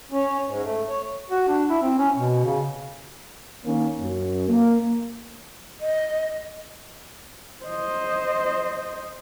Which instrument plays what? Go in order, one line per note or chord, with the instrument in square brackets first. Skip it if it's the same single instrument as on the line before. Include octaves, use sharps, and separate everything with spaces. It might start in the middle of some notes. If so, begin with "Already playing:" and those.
[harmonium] C#4
G#2
A3
C#5
[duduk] F#4
D4
E4
C4
C#4
B2
C#3
[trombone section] D#3 A#3 C#4
F#2
A#3
[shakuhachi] D#5
[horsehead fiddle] C5 D#5